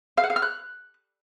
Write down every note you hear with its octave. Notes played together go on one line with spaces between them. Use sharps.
F5
F#5
F5
F6
F#6